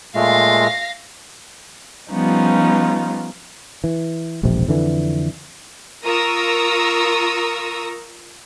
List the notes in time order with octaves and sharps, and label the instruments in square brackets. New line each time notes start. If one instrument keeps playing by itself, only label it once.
[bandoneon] A#2 G#3 A3 [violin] F5 A#6
[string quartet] F3 G3 B3 C#4 D#4 F4
[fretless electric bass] E3
E1 A#1 F2 C3
F2 D3 E3
[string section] F4 A#4 A#5 C#6 D#6 E6